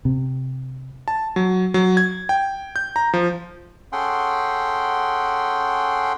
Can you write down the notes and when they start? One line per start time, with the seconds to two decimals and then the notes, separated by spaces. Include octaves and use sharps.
0.05 C3
1.08 A5
1.36 F#3
1.74 F#3
1.97 G#6
2.29 G5
2.76 G6
2.96 A#5
3.14 F3
3.92 C#4 G#4 A4 F#5 G5 C6